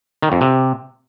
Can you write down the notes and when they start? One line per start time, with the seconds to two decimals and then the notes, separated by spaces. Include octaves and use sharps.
0.22 D#3
0.32 F2
0.41 C3